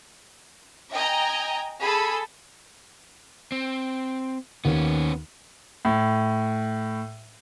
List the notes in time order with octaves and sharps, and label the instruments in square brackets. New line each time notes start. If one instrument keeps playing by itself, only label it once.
[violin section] D#5 G5 G#5 A#5
G#4 A4 B5 E6
[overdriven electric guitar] C4
[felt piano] D#2 [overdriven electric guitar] B3 C#4
[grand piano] A2